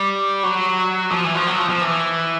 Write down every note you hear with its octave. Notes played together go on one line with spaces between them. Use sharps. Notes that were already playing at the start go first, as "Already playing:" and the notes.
Already playing: G3
F#3
F3
E3
F3
F#3
F3
F3
E3